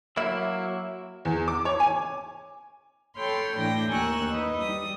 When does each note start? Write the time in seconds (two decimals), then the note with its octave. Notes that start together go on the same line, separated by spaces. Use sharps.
0.17 F#3 A#3 E4 E5
1.25 E2
1.48 D6
1.65 C#5
1.80 G#5
3.16 A4 C#5 G5 B5 C6 F6
3.57 A2 E3 D4 G5 A#6
3.89 D#2 A#4 G#5 C#6 E6 F#6
4.29 D#4 B4 D#5
4.60 G3 D#6